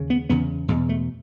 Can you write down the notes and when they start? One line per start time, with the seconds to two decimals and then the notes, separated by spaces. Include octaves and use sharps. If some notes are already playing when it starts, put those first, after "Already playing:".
Already playing: D#2 C#3
0.10 B3
0.30 E2 C#3 B3
0.68 E2 B2 G#3
0.89 A3